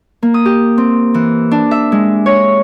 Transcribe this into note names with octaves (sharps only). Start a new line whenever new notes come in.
A#3
D#6
G4
C4
E3
D4
E5
G#3
C#5